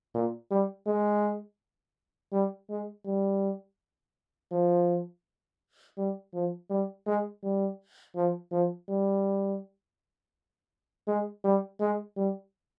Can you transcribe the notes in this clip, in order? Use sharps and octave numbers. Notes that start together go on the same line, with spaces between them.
A#2
G3
G#3
G3
G#3
G3
F3
G3
F3
G3
G#3
G3
F3
F3
G3
G#3
G3
G#3
G3